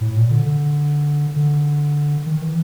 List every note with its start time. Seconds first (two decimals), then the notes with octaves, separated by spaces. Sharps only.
0.01 A2
0.16 A#2
0.31 D3
0.45 D3
1.36 D3
2.26 D#3
2.42 E3